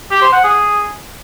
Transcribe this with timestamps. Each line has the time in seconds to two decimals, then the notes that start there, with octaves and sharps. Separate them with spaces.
0.11 G4
0.22 C5
0.33 F#5
0.44 G#4